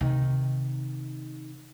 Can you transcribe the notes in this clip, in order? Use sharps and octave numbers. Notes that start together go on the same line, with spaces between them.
C3 D#3